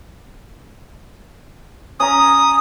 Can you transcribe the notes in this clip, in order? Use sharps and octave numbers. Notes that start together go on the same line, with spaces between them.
C#4 A#5 D#6